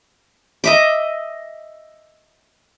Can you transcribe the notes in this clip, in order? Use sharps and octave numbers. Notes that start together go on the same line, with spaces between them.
D#5 E5 D6